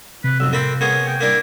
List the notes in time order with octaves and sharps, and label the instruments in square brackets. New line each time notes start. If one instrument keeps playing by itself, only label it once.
[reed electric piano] C3 [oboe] B4
[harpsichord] B1 F2 [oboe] E6
[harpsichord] A#3 A4 B5 [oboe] C4
[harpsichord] A#3 B3 G#4 [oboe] C#5
[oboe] G5
[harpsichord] A#3 D4 A#4 [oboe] E4